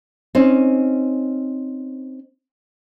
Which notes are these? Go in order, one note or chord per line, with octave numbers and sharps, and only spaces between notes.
C4 C#4 D#4